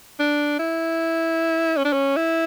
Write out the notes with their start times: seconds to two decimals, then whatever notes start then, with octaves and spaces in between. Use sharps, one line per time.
0.20 D4
0.59 E4
1.77 C#4
1.85 D4
1.93 C#4
2.16 E4